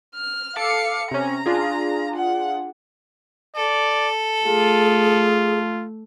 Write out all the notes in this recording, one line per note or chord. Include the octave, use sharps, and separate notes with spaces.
F6
A4 F5 D6 C#7
C3 C#4 A#5
D4 F4 G#4
F#5
A4 D5
A3 F4 G#4